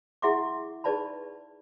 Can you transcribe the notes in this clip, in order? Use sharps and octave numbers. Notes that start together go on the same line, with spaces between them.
E4 G#4 E5 F#5 C6 D6
D#4 G#4 B4 D5 A5 B5